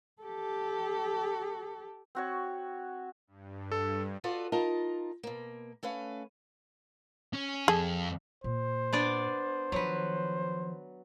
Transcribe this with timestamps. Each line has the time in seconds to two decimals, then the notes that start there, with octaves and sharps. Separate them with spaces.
0.22 G4 A4
2.15 C4 F#4 C#5
3.27 G2
3.72 A4
4.24 F4 F#4 A4 B4 D5 D#5
4.52 D#4 F4 A#4 D#5 A5
5.23 B2 A#3
5.83 A3 C#4 B4 F5
7.33 C#4
7.68 F2 G#4 A4
8.44 A#2 C5
8.93 B3 D4 D5
9.72 D#3 F3 F#3 B4